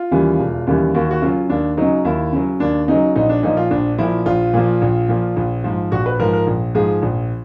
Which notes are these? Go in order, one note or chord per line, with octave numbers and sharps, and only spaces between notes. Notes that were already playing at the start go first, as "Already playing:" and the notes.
Already playing: F4
D#2 C#3 E3 G3
E1
D#2 C#3 E3 G3
D#2 F#4
F#4
C#3 F#3 F4
D#2 D4
C#3 F#3 D#4
D#2 E4
C#3 F#3
D#2 D4
C#3 F#3 D#4
A#1 D#4
D4
A#2 F3 D#4
F4
A#1 D4
A#2 F3 E4
A#1 F4
A#2 F3
A#1
A#2 F3
A#1
G#2 F3
A#1 F#4
B4
G#2 F3 A#4
A#4
A#1
G#2 F3 G#4
A#1